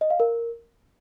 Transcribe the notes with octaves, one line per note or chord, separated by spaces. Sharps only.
D#5
F5
A#4